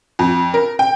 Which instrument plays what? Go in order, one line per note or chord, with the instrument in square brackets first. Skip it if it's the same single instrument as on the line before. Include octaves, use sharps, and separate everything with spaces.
[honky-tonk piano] F2
A#4
G5